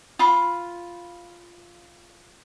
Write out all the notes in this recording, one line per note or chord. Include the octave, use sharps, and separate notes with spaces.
F4 B5